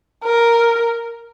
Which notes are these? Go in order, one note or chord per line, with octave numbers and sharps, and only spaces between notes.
A#4